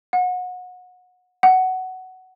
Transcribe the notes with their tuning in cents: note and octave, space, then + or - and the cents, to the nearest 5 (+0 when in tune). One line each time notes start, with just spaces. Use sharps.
F#5 -25
F#5 +15